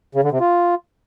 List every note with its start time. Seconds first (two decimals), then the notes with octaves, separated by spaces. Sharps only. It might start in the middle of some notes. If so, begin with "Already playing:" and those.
0.15 C#3
0.23 D3
0.32 C3
0.40 F4